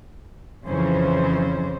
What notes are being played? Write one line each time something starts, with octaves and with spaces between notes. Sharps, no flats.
F2 C#3 E3 C#4 C5